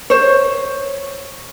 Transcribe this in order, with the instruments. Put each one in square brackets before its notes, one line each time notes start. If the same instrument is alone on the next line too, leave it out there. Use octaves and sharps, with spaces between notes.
[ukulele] C5 C#5